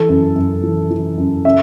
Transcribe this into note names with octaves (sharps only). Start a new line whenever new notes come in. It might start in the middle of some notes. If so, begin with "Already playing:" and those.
Already playing: E3 A4
F#2
F#2
E3
E3
F#2
C#3 E5